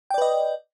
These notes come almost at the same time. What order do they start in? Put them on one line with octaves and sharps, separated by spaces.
G5 D5 B4 D#5